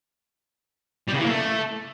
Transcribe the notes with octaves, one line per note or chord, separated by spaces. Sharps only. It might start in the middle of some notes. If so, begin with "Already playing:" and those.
G3
C#3
E3
A#3
A3